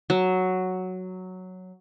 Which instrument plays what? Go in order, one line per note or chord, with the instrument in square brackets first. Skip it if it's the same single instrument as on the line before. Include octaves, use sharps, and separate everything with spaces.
[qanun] F#3